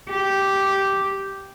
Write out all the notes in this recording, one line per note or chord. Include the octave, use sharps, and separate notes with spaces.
G4